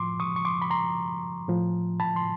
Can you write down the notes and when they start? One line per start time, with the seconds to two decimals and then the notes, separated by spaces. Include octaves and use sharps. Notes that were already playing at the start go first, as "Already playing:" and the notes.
Already playing: A2 F3 C6 D6
0.20 C#6 D#6
0.36 C#6
0.45 C6 D6
0.62 B5
0.70 A#5 C6
1.48 A2 F3
2.00 A5 B5
2.16 C6